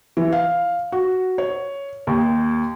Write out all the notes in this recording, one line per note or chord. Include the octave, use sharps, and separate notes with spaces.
E3
F5
F#4
C#5
D#2